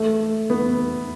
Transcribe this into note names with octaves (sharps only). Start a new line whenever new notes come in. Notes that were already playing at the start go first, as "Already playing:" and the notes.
Already playing: A3
B3